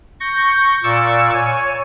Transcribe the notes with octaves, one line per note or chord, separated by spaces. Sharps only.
C#6 G6 A#6
A#2 D5 C#6 D6 E6
C#5 G#5